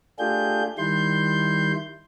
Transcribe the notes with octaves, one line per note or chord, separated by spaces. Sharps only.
A3 D4 F4 G4 G#4 G6
D#3 G3 E4 C6 G6